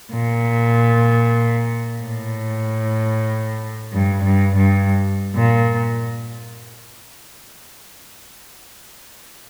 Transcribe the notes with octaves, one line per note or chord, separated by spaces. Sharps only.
A#2
A2
G2
G2
G2
A#2